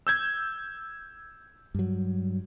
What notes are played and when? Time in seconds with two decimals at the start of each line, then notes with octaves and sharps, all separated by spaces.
0.07 E6 G6 G#6
1.75 G2 F#3